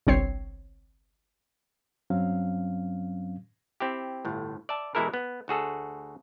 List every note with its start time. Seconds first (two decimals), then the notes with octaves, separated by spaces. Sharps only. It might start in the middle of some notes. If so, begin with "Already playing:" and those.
0.07 G1 C2 C4 C#5 C7
2.10 G2 F#3 C4 C#4 F5
3.80 C4 E4 G4
4.25 G1 A2
4.69 D5 E5 A5
4.95 B2 E3 G#3 E4 A4 A#4
5.14 B3
5.48 D2 F#4 G#4 A4